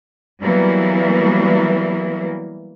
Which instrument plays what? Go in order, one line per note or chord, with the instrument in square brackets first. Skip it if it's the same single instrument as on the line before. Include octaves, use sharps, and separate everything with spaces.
[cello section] E3 F#3 G3 A#3 B3